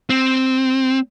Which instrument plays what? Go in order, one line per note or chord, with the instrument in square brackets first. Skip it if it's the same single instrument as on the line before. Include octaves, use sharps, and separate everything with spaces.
[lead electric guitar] C4